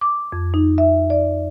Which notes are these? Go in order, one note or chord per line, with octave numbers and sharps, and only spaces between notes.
D6
F2
D#4
E5
D5